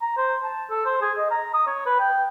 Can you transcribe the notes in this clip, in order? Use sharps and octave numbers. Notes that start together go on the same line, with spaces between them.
A#5
C5
A5
A4
C5
G#4
D#5
A#5
D#6
C#5
B4
G5